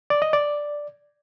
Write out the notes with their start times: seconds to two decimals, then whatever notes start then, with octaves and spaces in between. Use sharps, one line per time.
0.10 D5
0.22 D#5
0.33 D5